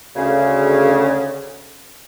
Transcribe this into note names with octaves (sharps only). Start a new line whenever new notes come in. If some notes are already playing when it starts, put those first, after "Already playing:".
D2 C#3